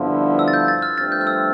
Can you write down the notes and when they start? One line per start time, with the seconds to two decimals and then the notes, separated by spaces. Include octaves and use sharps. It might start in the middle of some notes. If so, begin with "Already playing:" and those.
Already playing: G2 D3 F3 B3 E4
0.39 E6
0.48 A6
0.53 G6
0.68 A6
0.82 F6
0.97 G2 F3 A3 C4 A6
1.12 G6
1.21 F6
1.27 E6